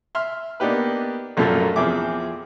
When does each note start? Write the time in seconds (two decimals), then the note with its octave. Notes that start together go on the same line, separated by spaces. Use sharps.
0.15 E5 C6 F6
0.60 A#3 B3 D4 D#4 G4 B4
1.37 A#1 F#2 A#2 A3 F4 A4
1.76 E2 F3 C4 G#4 E5 D6